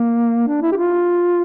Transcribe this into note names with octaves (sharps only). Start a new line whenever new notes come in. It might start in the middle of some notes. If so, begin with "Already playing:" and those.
Already playing: A#3
D4
E4
G4
F4